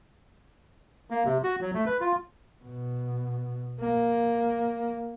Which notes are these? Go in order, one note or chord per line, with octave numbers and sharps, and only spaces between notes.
A#3
C3
F#4
F#3
A3
B4
F4
B2
A#3